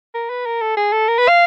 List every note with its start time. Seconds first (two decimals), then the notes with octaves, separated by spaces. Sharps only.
0.14 A#4
0.30 B4
0.46 A#4
0.61 A4
0.77 G#4
0.92 A4
1.08 A#4
1.19 B4
1.28 F5